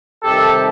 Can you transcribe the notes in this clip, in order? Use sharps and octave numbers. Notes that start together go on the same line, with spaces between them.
C3 D#3 G3 G4 A4